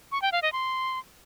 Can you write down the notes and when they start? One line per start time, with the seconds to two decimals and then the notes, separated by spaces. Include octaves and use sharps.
0.12 C#6
0.22 G5
0.32 F5
0.42 D#5
0.53 C6